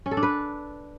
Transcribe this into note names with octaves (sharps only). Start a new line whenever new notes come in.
C#4
A4
D4
B4